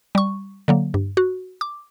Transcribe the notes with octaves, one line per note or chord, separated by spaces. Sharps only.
G3 C#6
D3 F#3 A#3
G2
F#4
D6